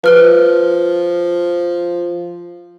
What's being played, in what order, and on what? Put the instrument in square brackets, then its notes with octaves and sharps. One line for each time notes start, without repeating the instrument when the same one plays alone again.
[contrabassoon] F3 [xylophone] B4 F6 G7